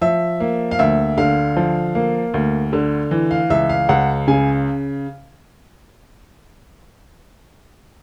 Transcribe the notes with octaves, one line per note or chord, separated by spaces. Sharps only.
F3 E5
A#3
F5
D2 E5
D3 F5
F3
A#3
D2
D3
E3
F5
C#2 E5
F5
C#2 F#5
C#3 G#5